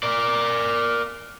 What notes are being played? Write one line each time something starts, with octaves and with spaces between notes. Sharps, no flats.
A#4 D5